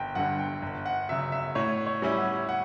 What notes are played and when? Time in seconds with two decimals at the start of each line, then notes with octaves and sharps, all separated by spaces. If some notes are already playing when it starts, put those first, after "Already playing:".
Already playing: G1 G5
0.15 G2 D3 F#5
0.39 G5
0.62 G1
0.86 F#5
1.09 F#2 C#3 E5
1.32 E5
1.55 A2 C#5
1.86 C#5
2.02 G3 C#4 E4
2.18 F#5
2.49 F#5